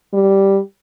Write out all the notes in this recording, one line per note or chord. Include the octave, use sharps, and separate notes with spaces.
G3